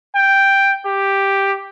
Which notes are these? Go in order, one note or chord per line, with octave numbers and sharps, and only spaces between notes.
G5
G4